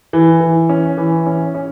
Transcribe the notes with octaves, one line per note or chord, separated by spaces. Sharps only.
E3
E3
C#4
E3
C#4
C#4